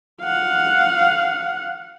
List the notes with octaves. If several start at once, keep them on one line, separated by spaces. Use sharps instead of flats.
F5 F#5